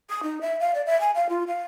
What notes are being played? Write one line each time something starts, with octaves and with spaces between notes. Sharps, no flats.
D#6
D#4
E5
F5
D5
E5
G#5
F5
F4
F5